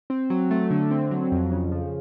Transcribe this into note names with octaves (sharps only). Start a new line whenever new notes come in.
C4
F#3
A3
D3
C4
F#3
F2
C#3
F3